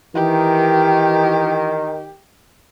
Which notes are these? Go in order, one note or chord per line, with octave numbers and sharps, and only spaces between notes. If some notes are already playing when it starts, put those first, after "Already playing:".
D#3 E3 G4